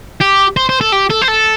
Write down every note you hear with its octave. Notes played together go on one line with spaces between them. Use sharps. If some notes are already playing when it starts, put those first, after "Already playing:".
G4
C5
C5
A4
G4
A4
C5
A4